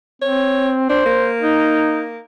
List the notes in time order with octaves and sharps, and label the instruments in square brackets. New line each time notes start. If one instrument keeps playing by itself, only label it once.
[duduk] C4 [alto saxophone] C#5
[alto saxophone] D4 [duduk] C5
[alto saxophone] A#3
[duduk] D#4